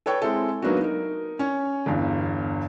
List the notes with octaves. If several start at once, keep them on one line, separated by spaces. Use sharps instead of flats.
A4 B4 C#5 G5 C#6
G#3 C4 E4 A4
F#3 A#3 B3 D4 D#4 F#4
D#4 A#4
C#4 C#5
G1 E2 G2